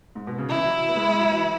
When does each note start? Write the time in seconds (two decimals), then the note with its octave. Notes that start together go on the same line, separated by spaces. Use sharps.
0.15 G#2
0.27 B2
0.38 C#3
0.49 E3 E4
0.65 F#3
0.88 B3
0.96 G#3
1.08 G#3
1.19 F#3
1.31 E3